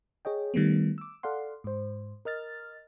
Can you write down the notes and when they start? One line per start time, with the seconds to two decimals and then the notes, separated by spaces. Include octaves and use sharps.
0.25 G#4 C#5 D#5 G5
0.54 D#3 G3 A3 B3
0.98 D6 E6
1.23 A4 D5 F5 F#5 C6
1.64 G#2 C5
2.25 A#4 D#5 F6 A6